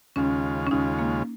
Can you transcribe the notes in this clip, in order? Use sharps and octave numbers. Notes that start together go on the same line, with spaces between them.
D#2 C#3 G#3 C#4 F4
C#4
D#2 C#3 G#3 D#4 F4
A#3